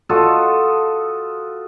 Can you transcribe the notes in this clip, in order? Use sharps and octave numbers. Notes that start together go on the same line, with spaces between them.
F4 F#4 A4 D#5